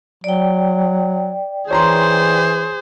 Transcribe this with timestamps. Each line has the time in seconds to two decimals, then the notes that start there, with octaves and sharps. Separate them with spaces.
0.24 F#3 D5 G5
1.71 E3 G#4 C5 C#5 A#5 C6